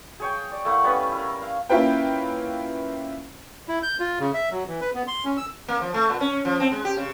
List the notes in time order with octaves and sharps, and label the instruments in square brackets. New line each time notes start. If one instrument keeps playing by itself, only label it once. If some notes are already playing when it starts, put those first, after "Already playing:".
[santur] G#4 C#5 G5
D5
A3 A#3 E4 F#5
G3 B3 C#4 B4
E4 A#4
F5
[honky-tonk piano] A#3 C#4 E4 F4 B4 G5
[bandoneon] E4
G6
F4
C#3
E5
F#3
E3
B4
B3
C6
C#4
E6
[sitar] A#3
F3
A3
A#2
C#4
F3
C4
G#3
G4
C#3